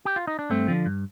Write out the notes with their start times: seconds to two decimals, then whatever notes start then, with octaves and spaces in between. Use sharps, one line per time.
0.05 G4
0.16 F4
0.27 D#4
0.39 D4
0.50 G2 A3 C4
0.68 D3 F3
0.86 G2